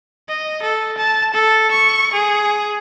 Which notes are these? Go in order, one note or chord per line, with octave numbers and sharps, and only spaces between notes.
D#5
A4
A5
A4
C#6
G#4